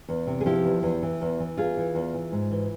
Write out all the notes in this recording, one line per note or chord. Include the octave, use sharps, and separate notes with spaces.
E2
C3
G#4
F3 E4 G4
E2
E2
E3
E2
E3
E2 F4 G#4
E3
E2
E3
G#2
E3